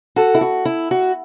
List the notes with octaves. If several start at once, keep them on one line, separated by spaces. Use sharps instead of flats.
F#4 A4
E4
F#4
E4
F#4